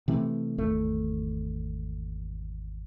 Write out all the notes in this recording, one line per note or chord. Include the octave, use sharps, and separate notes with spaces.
C3 E3 A3
G#1 E2 A3